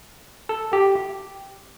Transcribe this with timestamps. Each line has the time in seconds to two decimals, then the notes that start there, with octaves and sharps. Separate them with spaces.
0.49 A4
0.73 G4